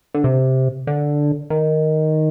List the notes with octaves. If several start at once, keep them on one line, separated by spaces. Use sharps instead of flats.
D3
C3
D3
D#3